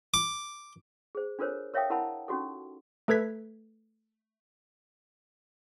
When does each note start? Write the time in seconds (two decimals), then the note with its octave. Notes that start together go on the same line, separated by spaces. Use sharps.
0.14 D6
1.15 G#4 C5
1.39 D4 F4 A4 A#4 C5 C#5
1.74 A#4 C#5 E5 F5 G5 D#6
1.90 E4 A#4 F#5 A5 B5
2.28 C#4 D#4 F#4 G4 A4
3.08 A3 A4 B4 G#6 B6